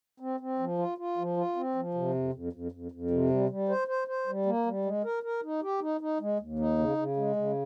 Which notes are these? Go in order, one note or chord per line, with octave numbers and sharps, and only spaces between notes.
C4
C4
F3
F4
F4
F3
F4
C4
F3
C3
F2
F2
F2
F2
F2
C3
G3
G3
C5
C5
C5
G3
A#3
G3
G#3
A#4
A#4
D#4
G4
D#4
D#4
G#3
D#2
D#4
C#3
C#3
G#3
C#3